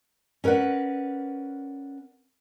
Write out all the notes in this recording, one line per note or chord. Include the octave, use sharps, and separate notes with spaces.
C#4 A#4 B4 D5 F#5